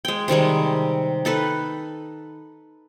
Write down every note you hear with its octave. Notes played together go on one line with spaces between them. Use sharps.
G#3 G5
C3 D#3 G3 G#3
D#4 A4 B4